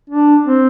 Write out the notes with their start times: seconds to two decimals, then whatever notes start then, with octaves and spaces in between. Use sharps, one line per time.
0.10 D4
0.46 C4